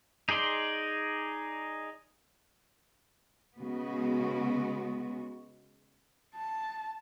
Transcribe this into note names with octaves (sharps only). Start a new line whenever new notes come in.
D#4 G#4 D5 C6
C#3 G#3 B3 F#4
A5